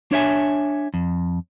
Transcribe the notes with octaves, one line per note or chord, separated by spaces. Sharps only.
D4 C#5 E5 G#5
F2